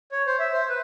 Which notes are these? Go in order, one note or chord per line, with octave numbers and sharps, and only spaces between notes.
C#5
C5
E5
C5
B4